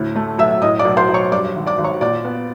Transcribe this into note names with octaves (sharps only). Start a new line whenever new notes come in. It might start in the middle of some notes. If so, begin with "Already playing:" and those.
Already playing: D2 A2
A3
B1 E5 E6
A2 D#5 D#6
D5 D6
B1
C5 C6
B1
C#5 C#6
G2 D5 D6
G#1
D5 D6
G#1
C#5 C#6
A#2 D5 D6
B3